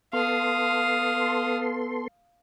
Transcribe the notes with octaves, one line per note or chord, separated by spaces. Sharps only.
B3 A4 F5 C6 D#6